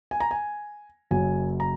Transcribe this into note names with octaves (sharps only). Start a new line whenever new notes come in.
G#5
A#5
G#5
F#1 F#2 F#3 G#5
A#5